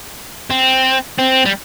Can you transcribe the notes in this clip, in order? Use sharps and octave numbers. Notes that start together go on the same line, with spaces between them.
C4
C4
G3